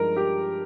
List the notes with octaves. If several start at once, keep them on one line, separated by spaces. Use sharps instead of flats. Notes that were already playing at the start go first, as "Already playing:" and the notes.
Already playing: G2 F3 G#3 D#4 A#4
G4